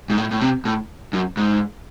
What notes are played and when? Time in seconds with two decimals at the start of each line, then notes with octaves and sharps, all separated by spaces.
0.10 G#2
0.18 A2
0.31 A2
0.41 C3
0.65 A2
1.13 F#2
1.37 G#2